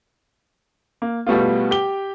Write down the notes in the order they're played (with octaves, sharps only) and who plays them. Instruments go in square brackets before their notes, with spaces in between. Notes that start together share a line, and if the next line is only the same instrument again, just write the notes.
[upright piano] A#3
B2 G3 A3 B3 F4
G4 G7